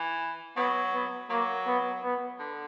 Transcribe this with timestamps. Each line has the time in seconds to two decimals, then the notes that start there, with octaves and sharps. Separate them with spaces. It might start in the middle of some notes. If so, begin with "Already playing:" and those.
Already playing: E3
0.57 F#3 B3
0.94 B3
1.30 F#3 A#3
1.67 B3
2.03 B3
2.39 D3